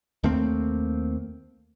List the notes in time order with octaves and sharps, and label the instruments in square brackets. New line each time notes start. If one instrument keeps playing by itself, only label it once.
[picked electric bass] D#2 A3 A#3 C4